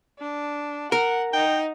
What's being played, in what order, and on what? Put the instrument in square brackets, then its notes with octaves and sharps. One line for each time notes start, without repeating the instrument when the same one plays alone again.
[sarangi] D4
[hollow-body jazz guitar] A#4 [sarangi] F#5
[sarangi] D#4 [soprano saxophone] G5